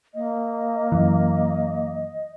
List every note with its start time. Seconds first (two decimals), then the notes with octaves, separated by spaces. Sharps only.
0.14 A#3 D#5
0.92 F#2 E3